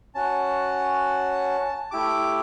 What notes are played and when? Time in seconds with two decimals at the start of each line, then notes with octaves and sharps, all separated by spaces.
0.15 C#4 F#4 A5
1.91 A3 E4 G4 D6